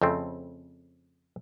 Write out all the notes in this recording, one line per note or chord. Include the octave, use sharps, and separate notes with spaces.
F2 C#3 A3 C4